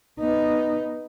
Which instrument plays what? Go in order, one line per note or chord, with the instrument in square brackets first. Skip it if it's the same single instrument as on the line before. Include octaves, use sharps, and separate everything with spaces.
[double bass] B3 D#4